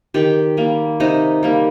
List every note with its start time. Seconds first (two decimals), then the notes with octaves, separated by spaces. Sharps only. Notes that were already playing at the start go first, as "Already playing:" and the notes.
0.14 D#3 G4
0.57 G3 A#3
1.00 C3 D#4
1.43 G3 A#3